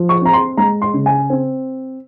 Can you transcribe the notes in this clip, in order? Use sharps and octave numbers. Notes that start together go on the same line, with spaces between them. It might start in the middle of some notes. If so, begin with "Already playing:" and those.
Already playing: F3
C#6
C4 A#5
C6
G#3 A#5
C6
C#3
G#5
C4